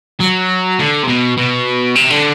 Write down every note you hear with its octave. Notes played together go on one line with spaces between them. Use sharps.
F#3
D3
C3
B2
B2
C3
D3